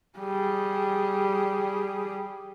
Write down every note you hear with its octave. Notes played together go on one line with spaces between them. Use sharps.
G3 G#4